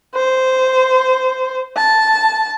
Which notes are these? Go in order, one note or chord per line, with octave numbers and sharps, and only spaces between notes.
C5
A5